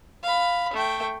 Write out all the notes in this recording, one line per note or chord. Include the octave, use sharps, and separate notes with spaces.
F5 B5
A3 G5